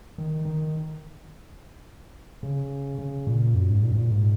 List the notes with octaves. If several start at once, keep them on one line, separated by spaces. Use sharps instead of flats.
D#3
D#3
C#3
C#3
A#2
F#2
G#2
A#2
G#2
A#2
G#2